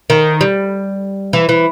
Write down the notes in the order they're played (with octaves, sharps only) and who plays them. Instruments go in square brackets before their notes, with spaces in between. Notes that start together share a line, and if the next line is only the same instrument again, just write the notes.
[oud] D#3
G3
E3
E3